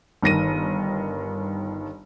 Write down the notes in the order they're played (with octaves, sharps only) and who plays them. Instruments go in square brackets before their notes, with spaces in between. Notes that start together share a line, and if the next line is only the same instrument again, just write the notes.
[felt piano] G1 D#3 A#6 D#7